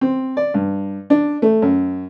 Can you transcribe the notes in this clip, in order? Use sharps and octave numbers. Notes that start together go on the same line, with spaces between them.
C4
D5
G2
D4
A3
F#2